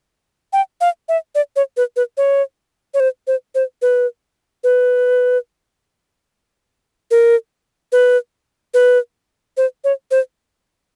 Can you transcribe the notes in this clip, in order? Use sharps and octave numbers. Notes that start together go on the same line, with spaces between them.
G5
F5
E5
D5
C#5
B4
B4
C#5
C#5
C5
C5
C5
B4
B4
A#4
B4
B4
C5
C#5
C5